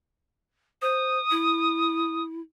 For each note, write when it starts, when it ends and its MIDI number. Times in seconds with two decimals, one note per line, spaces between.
0.82 1.19 72
0.82 2.23 87
1.31 2.41 64